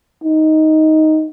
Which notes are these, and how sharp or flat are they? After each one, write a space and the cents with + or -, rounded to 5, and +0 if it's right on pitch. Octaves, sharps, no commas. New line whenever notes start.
D#4 +10